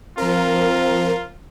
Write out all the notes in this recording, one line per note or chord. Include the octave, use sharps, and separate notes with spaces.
F3 C4 F4 A#4